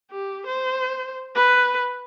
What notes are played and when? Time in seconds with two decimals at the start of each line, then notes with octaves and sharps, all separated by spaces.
0.11 G4
0.46 C5
1.35 B4